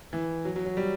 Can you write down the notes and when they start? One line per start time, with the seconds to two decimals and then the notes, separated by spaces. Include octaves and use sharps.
0.13 E3
0.45 F#3
0.56 F#3
0.66 F#3
0.77 G3